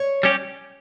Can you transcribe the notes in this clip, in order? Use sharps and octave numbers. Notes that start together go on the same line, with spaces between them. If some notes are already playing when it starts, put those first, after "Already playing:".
Already playing: C#5
G3 C#4 G4